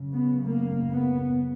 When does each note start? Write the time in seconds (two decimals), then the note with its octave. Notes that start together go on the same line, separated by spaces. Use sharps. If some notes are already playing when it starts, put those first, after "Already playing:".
Already playing: F#2 C#3
0.12 B3
0.43 A#3
0.90 B3